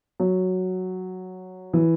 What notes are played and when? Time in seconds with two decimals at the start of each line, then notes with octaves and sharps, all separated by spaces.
0.20 F#3
1.73 E3